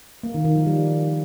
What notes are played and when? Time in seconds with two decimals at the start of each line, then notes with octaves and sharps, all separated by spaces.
0.23 A#3
0.34 D#3
0.45 D#3
0.55 F3
0.66 G3